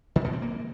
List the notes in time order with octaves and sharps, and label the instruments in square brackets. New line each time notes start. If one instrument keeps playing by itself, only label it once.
[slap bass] D#3
B2
C4
A#3